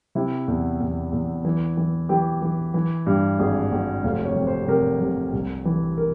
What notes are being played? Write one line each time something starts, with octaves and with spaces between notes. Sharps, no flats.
C3 E4
E2
E2
E2
E3
E3
E3 G4
E3
E3
G2
G#1 G#4
G#1
F1 F5
C#5
C3
C5
C3 A#4
C3
C2
E3
A#4